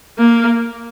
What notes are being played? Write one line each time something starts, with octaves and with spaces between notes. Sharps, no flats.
A#3